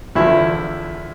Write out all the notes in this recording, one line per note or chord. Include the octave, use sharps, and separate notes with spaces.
E2 D3 F3 E4